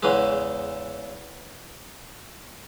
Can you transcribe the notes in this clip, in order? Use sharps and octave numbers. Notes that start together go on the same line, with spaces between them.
E2 C#3 E3 G#3